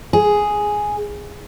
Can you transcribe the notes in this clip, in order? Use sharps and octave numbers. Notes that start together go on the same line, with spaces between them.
G#4